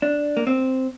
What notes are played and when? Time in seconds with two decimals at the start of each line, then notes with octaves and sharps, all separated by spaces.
0.02 D4
0.37 A#3
0.47 C4